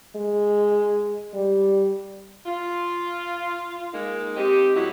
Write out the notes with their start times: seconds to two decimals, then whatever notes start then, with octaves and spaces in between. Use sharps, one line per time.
0.16 G#3
1.34 G3
2.45 F4
3.92 G#3 A#3 D#4
4.36 C4 D#4 G4
4.75 A2 F#3 G#3 D#4 E4 F#4